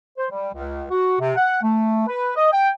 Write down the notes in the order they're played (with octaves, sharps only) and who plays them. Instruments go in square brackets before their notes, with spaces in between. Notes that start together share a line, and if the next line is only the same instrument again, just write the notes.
[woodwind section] C5
G3
C#2
F#4
C3
F#5
A3
B4
D#5
G5